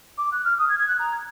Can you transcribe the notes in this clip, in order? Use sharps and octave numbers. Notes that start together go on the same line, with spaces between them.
D6
F#6
F6
D#6
G#6
G#6
F#6
A#5